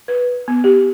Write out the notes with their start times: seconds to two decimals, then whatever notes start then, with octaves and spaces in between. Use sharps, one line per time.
0.08 B4
0.48 B3
0.64 G4